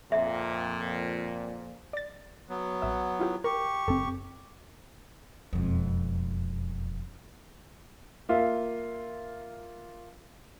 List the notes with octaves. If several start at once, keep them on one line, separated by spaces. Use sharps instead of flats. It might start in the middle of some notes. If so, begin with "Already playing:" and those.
F2 A#2 E5
D5 A6
F#3 B3
A#1 E5
E4 F4 G4
G4 A#4 C#6
F#1 C4 A4
E1 F2
A#3 F4 E5